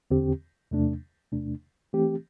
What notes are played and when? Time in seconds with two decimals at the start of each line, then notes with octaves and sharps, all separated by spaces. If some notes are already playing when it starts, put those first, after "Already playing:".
0.11 E2 D3 C4 G4
0.71 E2 C3 A3 D4
1.32 E2 C3 A3 D4
1.93 E3 A3 C4 G4